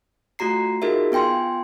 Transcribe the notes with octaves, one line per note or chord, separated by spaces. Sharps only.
A3 F4 F#4 A#5 C7
D#4 F4 F#4 G#4 A#4 E5
B3 F4 G5 G#5 C6